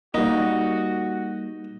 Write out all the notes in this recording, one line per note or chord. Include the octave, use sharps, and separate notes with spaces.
G3 A#3 D#4 F#4